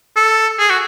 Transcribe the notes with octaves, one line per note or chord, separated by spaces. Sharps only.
A4
G#4
F#4